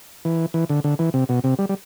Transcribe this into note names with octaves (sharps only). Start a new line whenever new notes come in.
E3
E3
D3
D3
E3
C3
B2
C3
G3
G3